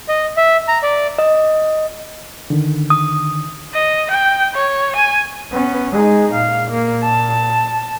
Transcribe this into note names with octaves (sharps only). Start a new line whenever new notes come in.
D#5
E5
A#5
D5
D#5
D3 D#3
D#6
D#5
G5
C#5
G#5
B3 C#4
G#3 D#4 G#4
A#2 F5
A#3
A5